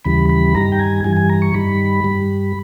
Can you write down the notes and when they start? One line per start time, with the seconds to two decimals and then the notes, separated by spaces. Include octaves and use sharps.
0.05 D#2 C#3 E3 G3 B5
0.30 B5
0.55 G2 D#3 G3 A#5
0.72 G5
0.79 G#5
1.04 G2 E3 G3 G#5
1.17 G#5
1.29 A#5
1.42 C#6
1.54 G2 D#3 G3 B5
2.04 G2 G3